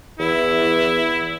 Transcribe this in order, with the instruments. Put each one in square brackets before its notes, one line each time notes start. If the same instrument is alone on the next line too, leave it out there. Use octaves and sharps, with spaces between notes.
[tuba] E2 [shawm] E4